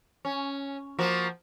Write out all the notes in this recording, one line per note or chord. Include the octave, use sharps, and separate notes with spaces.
C#4
F3 A#3 F#4